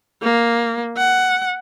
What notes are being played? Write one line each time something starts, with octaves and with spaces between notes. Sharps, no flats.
A#3
F#5